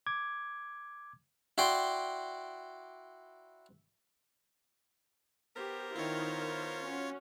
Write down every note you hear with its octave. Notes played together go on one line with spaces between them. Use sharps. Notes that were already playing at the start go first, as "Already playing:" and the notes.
D6 G#6
E4 F#4 D5 G5 C6
B3 G4 A#4 C5
D#3 E4 F4 C#5
C#4 F#4